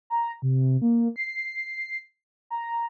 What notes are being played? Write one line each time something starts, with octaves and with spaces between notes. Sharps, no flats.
A#5
C3
A#3
C7
A#5